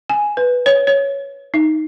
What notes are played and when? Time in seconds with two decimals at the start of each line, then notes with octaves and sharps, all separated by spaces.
0.09 G#5
0.37 B4
0.66 C#5
0.87 C#5
1.54 D#4